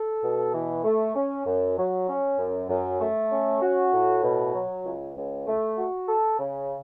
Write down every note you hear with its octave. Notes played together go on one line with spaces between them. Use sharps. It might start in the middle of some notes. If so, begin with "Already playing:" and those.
Already playing: A4
B2
E3
A3
C#4
F#2
F#3
C#4
F#2
F#2
A3
C#4
F#4
A2
B2
F#3
C#2
C#2
A3
F#4
A4
C#3